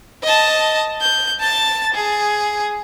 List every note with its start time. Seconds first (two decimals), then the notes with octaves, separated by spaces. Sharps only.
0.23 D#5 A5
1.01 G6
1.40 A5 A6
1.94 G#4